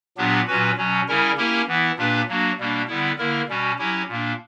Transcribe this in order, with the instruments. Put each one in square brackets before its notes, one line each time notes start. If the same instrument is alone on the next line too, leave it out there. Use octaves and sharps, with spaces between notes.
[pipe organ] A#2 F#3 B3 D4 G4
A#2 F#3 C#4 F#4 B4
B2 F#3 C#4
C#3 G3 C#4 E4 A#4
A#3 C#4 E4 G4 A#4
E3 B3 E4
A#2 A#3 D4 G4 B4
F#3 A#3 D4 F#4
B2 G3 A#3 D4
D3 G3 B3 E4
D3 A#3 E4 A#4
B2 G3 C#4 F#4
F#3 C#4 E4 G4
A#2 A#3 D4